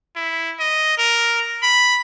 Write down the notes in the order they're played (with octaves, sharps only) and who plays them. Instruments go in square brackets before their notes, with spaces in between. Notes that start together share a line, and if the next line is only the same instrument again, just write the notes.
[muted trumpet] E4
D#5
A#4
B5